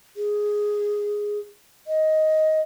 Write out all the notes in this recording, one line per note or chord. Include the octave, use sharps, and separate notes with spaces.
G#4
D#5